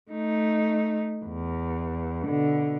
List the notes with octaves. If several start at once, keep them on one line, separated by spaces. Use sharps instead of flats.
A3 D#4
E2
B2 D3